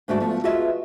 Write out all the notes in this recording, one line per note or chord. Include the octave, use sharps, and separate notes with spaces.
G#2 D3 A3 F#4 D5
F3 A3 B3
F4 F#4 G#4 B4 D#5 E5